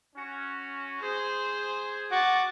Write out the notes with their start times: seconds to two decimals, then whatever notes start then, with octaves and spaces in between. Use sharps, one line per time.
0.16 C#4 F#4
1.02 G#4 C5
2.11 F#4 D6 A6